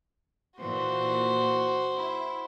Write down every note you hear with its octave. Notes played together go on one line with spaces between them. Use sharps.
A#2 E3 F#4 C5
E4